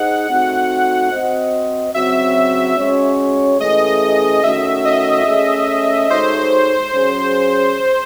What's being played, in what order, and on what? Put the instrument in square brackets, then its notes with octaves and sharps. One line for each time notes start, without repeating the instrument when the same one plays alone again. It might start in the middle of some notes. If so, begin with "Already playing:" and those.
Already playing: [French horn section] D#4 G#4 C5 D#5 [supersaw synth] F#5
[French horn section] A3 C4 D#4 F#4
C4 F#4 C5 D#5
[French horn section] C#3 F#3 C4 F#4 [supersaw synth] E5
[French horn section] G#3 C#4 F#4 C#5
[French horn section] E3 A3 C#4 G#4 [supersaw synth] D#5
[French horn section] D#3 A3 C#4 F#4 [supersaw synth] E5
[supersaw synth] D#5
[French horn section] A3 C#4 G#4
[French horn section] G#3 D#4 F#4 A4 C#5 [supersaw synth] C5
[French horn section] F#3 C#4 G#4